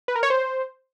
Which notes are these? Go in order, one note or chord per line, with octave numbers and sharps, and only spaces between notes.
B4
A#4
C#5
C5